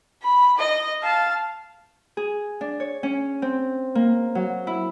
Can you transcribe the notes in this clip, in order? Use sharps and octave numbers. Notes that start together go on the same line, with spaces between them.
B5
D#5
F5 A5
G#4
D4
C#5
C#4
C4
A#3
F#3
E4